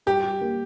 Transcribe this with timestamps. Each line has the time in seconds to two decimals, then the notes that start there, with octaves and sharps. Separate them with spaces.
0.06 G3 G4
0.23 G3
0.41 A#3